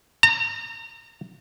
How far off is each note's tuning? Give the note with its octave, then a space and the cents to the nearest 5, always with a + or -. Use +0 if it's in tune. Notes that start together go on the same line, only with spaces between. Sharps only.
A#5 -35